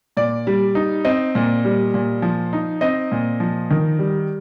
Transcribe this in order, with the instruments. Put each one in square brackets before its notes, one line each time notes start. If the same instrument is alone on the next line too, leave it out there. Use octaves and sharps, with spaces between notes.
[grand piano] A#2 D5
G3
D#4
C4 D#5
A#2
G3
A#2
F3
D#4
C4 D#5
A#2
F3
D#3
G3